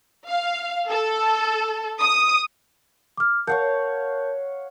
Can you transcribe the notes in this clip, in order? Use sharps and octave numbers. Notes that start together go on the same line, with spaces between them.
F5
A4
D#6
D6 F6
A#4 C#5 F5 F#5 A5 G6